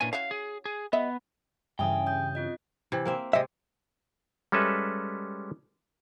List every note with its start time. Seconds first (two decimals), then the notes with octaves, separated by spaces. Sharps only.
0.01 A#2 E3 C#4 D4 G#5
0.13 C#4 E4 F#4 F5
0.31 G#4
0.65 G#4
0.93 G3 B3 D#5 E5
1.79 G2 C#3 E3 E5 G5 G#5 D#6
2.07 D#6 G6
2.35 C4 F4 D#5
2.92 C3 E3
3.05 A#3 C4 E5
3.33 C3 G#3 D#5 E5
4.52 G3 G#3 C#4 A4 B4 E5